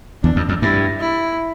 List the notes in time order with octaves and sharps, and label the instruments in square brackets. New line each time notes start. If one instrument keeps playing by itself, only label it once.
[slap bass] E2 [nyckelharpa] D4
[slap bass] F2
F2
[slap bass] G2 [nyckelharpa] E4
[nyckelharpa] E4